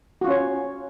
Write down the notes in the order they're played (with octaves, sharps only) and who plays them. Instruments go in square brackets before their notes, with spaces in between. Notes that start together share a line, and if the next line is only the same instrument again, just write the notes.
[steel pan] F#4
F4
C#4
C#5